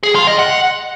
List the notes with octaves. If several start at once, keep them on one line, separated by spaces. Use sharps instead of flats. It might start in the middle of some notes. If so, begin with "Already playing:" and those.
G#4
F4
D#5
F#5